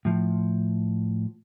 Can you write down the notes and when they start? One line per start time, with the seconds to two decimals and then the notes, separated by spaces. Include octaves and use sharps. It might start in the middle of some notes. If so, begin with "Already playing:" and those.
0.05 A2 F3